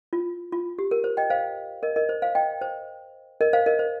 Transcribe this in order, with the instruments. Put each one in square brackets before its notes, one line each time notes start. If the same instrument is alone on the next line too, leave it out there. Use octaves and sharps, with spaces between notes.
[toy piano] F4
F4
G4
A#4
C5
D#5 G5
C5 F5
A#4 D#5
A#4 D#5
C5
C5 F5
D#5 G5
C5
A#4 D#5
C5 F5
A#4 D#5
C5